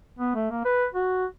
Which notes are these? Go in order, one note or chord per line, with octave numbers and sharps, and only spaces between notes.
B3
A3
A#3
B4
F#4